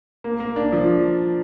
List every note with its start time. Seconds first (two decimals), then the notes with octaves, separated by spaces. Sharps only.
0.24 A#3
0.40 A#3
0.56 D4
0.72 F3